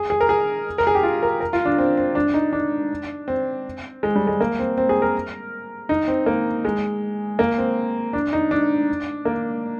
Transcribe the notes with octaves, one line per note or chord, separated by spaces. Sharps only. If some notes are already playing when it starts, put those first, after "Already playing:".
Already playing: G#4
G#4
A#4
G#4
A#4
G#4
G4
F4
A#4
A#4
F4
D4
C4
C4
D4
D#4
D4
C4
G#3
G3
G#3
A#3
C4
C4
G#4
A#4
D#4
C4
A#3
G#3
A#3
C4
D4
D#4
D4
A#3